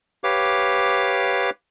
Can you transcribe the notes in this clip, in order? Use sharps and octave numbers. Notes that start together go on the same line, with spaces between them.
G4 B4 C#5 F5 D6